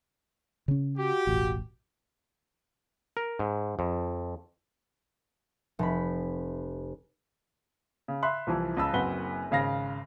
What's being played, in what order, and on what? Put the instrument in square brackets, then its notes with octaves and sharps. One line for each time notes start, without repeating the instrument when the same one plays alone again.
[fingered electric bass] C#3 C#4
[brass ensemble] F#4 G4
[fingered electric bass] E1 A1
[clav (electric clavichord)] A#4
G#2
F2
[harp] F1 B5
[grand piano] C#3
E5 B5 C6 F#6
C2 E3 F3
C#2 C#3 A5 B5 E6
F#1 F#2 C4 B4 F#5 G7
G#1 C#3 F5 A#6